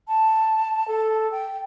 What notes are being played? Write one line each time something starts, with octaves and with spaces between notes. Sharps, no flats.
A5
A4
G5